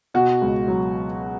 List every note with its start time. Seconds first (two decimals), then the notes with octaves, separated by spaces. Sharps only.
0.14 B2 F#4
0.41 C#2
0.68 F#3